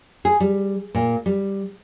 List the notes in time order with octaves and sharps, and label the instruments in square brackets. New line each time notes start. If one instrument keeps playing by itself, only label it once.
[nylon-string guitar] G#4
G3
A#2
G3